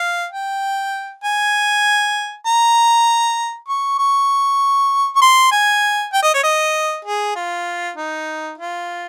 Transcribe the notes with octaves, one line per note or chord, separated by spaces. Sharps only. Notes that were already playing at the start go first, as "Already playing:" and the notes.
Already playing: F5
G5
G#5
A#5
C#6
C#6
C#6
C6
G#5
G5
D#5
C#5
D#5
G#4
F4
D#4
F4